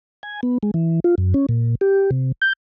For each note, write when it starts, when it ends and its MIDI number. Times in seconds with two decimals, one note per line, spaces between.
0.23 0.41 80
0.43 0.58 59
0.63 0.71 56
0.74 1.00 52
1.04 1.15 65
1.18 1.34 42
1.34 1.46 61
1.49 1.75 46
1.81 2.10 67
2.11 2.32 48
2.42 2.53 91